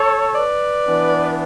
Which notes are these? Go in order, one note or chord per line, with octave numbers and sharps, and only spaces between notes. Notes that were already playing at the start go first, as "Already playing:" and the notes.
Already playing: A4 C#5
B4 D5
E3 B3 D4